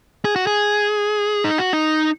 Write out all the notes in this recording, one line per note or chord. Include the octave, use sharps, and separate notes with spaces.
G#4
F#4
G#4
D#4
F#4
D#4